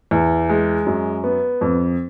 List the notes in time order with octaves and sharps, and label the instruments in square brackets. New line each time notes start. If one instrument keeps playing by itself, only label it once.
[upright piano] E2
G#3
F#2
B3
F2